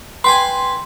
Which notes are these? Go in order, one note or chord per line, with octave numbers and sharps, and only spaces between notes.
B4 G5 G#5 C6